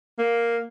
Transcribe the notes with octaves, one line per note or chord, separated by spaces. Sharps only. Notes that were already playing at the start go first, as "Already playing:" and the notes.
A#3